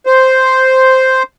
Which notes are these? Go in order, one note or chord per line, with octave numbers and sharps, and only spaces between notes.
C5